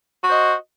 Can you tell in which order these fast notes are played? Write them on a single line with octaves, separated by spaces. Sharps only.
F#4 C5 D#5